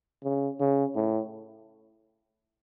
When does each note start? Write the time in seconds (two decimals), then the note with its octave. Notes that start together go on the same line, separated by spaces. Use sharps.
0.24 C#3
0.59 C#3
0.96 A2